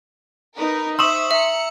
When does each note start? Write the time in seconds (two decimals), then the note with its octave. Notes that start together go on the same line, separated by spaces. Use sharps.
0.56 D#4 A#4 B4
0.99 C5 E5 C6 C#6 D#6 E6 E7 F#7
1.31 E5 A#5 C#7